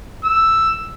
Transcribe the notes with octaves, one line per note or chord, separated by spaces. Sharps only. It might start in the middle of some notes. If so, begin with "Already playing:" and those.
E6